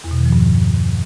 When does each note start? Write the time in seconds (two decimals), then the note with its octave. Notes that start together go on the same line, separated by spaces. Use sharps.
0.04 E2
0.11 B2
0.18 D#3
0.25 F3
0.33 G2